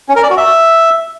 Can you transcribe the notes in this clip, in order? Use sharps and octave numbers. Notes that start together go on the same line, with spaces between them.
C#4
A#4
D5
F#4
E5